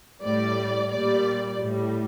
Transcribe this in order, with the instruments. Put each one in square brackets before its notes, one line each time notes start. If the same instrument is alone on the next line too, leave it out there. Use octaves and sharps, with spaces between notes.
[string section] A2 G3 D5
A#2 G3 D5
A2 G3